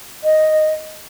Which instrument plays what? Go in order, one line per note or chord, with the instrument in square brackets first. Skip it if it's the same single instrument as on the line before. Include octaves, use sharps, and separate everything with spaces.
[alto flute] D#5